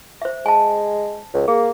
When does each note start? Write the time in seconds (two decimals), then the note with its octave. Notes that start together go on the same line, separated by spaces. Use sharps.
0.22 C5 E5
0.46 G#3 G#5 A5
1.34 C#2
1.48 A#3 G#4